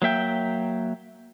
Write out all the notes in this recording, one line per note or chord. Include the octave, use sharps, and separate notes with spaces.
F#3 A#3 E5 G5